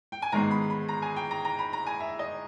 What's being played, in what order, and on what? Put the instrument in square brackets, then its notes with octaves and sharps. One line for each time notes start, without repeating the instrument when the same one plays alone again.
[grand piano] G5
G#5
G#2 D#3 G#3 B3 A#5
B5
B5
A#5
G#5
G5
A#5
A#5
B5
A#5
G#5
E5
D#5